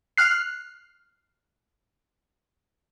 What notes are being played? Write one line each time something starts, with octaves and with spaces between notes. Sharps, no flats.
F6 F#6 C7